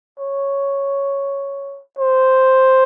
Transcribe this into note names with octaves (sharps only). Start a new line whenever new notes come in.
C#5
C5